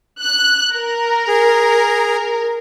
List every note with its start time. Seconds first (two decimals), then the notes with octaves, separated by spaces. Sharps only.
0.23 F#6
0.74 A#4
1.28 G#4